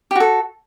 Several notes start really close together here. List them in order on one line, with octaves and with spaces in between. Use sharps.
G4 F#4 A4